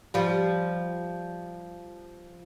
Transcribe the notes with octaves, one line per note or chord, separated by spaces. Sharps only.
F3 G3